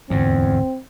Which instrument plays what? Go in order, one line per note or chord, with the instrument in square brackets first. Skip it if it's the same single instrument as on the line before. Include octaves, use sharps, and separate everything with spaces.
[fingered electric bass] D1 G#2 D3 [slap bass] E2 [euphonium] C4